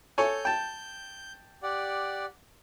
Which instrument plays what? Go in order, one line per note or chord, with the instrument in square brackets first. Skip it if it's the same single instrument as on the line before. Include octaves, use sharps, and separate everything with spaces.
[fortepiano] A4 C#5 G#5 [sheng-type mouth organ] G6
[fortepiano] G5 A5
[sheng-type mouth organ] G4 D5 F#5